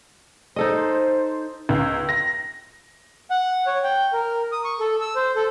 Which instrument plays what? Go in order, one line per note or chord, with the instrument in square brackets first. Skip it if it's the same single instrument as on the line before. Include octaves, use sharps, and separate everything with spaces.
[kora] D#4 A4 D#5 [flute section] C5
[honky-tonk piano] C#2
A#6
[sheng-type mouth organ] F#5
C#5
G5
A#4
D#6
C#6
A4
E6
C5
A4